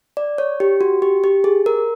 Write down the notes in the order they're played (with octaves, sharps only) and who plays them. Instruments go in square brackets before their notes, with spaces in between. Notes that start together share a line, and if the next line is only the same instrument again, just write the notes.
[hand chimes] D5
C#5
G4
F#4
G4
G4
G#4
A#4